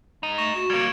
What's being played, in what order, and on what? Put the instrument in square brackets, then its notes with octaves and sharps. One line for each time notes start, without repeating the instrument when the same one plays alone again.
[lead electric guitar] G#3 D#4
[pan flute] A3 [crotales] C#6 A#6 E7
[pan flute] F#4
[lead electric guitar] G3 A#3 [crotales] G#6 C#7 D7